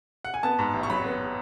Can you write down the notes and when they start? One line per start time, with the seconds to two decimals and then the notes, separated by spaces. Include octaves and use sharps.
0.25 F#5
0.34 G#5
0.43 B3 A5
0.59 G#2
0.74 A1
0.83 C#6
0.90 F#3 B5
1.04 B3